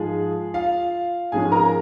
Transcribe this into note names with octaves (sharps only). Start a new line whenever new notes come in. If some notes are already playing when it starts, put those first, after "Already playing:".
Already playing: G#2 F3 G#3 G#4
F4 F5
G#2 F3 G#3 C#4 G#4 G#5
A#4 A#5